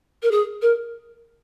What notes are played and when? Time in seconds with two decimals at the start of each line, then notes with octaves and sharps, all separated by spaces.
0.23 A#4
0.31 G#4
0.62 A#4